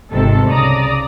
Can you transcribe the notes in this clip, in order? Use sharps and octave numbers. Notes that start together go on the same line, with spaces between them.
G#1 C3 D#3 A4
C2 C#3 D5 A#5 D#6